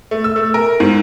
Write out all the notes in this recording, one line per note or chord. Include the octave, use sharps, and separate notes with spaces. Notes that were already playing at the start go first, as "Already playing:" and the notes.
A3
E6
A3
A#4
G#2